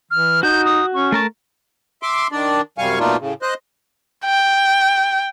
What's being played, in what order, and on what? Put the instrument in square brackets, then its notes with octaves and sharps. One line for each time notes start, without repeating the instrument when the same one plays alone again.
[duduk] E3 [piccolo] F6
[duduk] D#4 [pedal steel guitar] F#4 [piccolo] G6
[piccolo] D#6
[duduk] C#4 [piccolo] C#6
[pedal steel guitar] A3 A#4 A5
[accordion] E5 C6 D6
D#3 D4 D5
F#2 C3 G3 F5 G#5 C#6
B2 A3 A#3 D4 D#4 F4
A2 C#3
C5 D#5 F#6
[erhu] G5